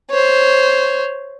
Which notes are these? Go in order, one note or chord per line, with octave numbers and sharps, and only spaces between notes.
C5 C#5